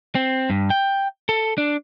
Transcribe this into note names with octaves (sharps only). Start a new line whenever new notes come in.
C4
G2
G5
A4
D4